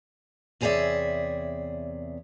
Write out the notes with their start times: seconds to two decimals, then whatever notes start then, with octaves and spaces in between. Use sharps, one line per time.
0.61 E2 C3 G#4 C#5 D5 E5